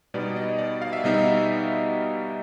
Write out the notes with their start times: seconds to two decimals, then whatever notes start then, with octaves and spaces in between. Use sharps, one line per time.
0.14 B2 G3 B3 D#4 D5
0.36 D#5
0.58 D5
0.82 F5
0.93 E5
1.04 B2 G3 B3 D#4 D#5
1.14 E5